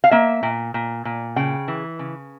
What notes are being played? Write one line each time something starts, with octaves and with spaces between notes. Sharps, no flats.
F5
A#3 E5
A#2
A#2
A#2
C#3 G5
E3
C#3